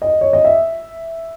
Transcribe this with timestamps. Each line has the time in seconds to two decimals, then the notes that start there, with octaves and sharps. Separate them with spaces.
0.02 D#5
0.21 C#5
0.33 D#5
0.44 E5